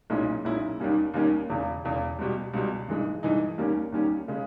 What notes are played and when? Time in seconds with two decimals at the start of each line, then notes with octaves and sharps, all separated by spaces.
0.10 B1 A#2 G#3 C#4 E4
0.44 B1 A#2 G#3 C#4 E4
0.80 D#2 D#3 G3 A#3 C#4
1.14 D#2 D#3 G3 A#3 C#4
1.49 E1 E2 C#3
1.84 E1 E2 C#3
2.19 C#2 B2 G3
2.54 C#2 B2 G3
2.88 G2 E3 G#3 D#4
3.23 G2 E3 G#3 D#4
3.58 D#2 D#3 G3 A#3 C#4
3.92 D#2 D#3 G3 A#3 C#4
4.28 C#3 G#3 C#4